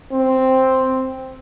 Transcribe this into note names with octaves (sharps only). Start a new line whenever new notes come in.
C4